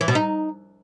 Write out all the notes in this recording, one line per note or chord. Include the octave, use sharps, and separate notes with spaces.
E3
B2
D#4